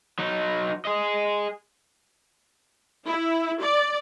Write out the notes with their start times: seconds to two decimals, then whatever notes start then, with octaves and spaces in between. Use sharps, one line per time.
0.19 F#3 D#4
0.85 G#4 D#5
3.06 E4
3.60 D5